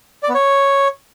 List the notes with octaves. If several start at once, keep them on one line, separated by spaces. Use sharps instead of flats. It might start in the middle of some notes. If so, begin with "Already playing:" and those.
D5
B3
C#5